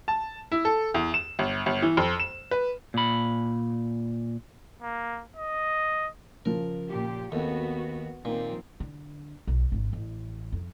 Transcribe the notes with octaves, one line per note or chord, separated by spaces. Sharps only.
A5
E4
A4
E2
E7
G1
G1
E3
F2
E7
B4
A#2 B5
A#3
D#5
C#3 F3 A#4
A#2 G4
D#2 B3 C4 F#4 A4
A#2 D#3 F3 A#3 C4
D3
B1
G#1 D3
A1
F2